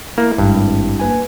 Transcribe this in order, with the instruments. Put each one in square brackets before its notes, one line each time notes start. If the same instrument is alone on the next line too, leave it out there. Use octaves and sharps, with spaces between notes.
[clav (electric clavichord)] A#3 [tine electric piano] E4
[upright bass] G#1 [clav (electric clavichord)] G2
[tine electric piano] A#3 B4 G#5